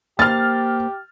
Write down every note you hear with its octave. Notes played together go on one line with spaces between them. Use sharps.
A#3 G4 C5 F6 A6